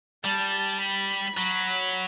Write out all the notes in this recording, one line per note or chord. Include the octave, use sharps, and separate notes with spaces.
G3 A5
B5
F#3 B5